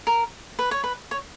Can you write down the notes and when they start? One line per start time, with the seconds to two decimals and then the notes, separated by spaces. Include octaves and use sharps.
0.07 A#4
0.59 B4
0.71 C#5
0.84 B4
1.11 C#5